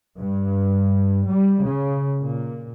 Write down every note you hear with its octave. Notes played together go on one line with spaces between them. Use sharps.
G2
G3
C#3
A#2